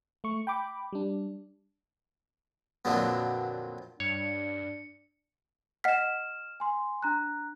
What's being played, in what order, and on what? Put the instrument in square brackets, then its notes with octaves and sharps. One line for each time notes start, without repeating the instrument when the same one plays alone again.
[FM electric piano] A3 C#6
G5 B5 D6
G3 D4
[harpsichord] F2 A#2 D3 F#3 B3
[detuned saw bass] G2 [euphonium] D4 [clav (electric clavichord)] C#5 [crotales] C#7
[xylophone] D#5 F#5 B6 [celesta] F6 E7
[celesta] G#5 C6
D4 A#5 F#6